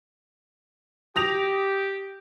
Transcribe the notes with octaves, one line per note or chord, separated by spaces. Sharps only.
G4 D#6 A#6 F7